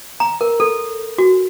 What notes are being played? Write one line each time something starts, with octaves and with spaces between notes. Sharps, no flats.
A#5
A#4
A4
F#4